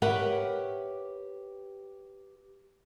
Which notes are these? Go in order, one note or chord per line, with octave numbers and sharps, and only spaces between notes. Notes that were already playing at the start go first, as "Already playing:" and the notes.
G4 A#4 B4 C#5 E5 F#5